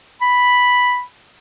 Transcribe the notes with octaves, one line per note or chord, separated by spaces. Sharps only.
B5